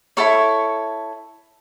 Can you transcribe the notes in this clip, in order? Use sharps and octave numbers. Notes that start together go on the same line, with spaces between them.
E4 A4 C#5 C#6